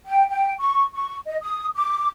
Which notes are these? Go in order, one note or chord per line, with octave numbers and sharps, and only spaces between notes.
G5
G5
C#6
C#6
D#5
D#6
D6